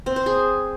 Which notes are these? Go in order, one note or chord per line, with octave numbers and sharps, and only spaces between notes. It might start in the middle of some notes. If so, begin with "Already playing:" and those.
C4
C5
G#4